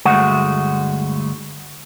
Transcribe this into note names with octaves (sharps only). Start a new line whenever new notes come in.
D2 G2 G#3 A3 F#4 F#5